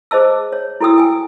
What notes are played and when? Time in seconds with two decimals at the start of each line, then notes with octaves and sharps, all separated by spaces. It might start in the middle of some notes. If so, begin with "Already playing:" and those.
0.11 G#4 C5 D#5 A5 E6
0.52 C#5
0.80 E4 F#4 A4 G5 D#6 E6
0.96 A4 G5 G#5